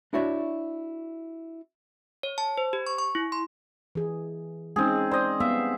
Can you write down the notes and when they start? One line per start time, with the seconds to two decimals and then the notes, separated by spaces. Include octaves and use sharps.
0.13 D4 E4 F#4 C#5 D5 E5
2.23 C#5
2.38 A5
2.58 C5
2.73 G4
2.87 C#6
2.99 C#6
3.15 E4
3.32 C6
3.95 E3 G#4
4.76 G#3 C4 C#4 D#4 G#4
5.11 C5 D5 D#5
5.40 G3 B3 E5 F5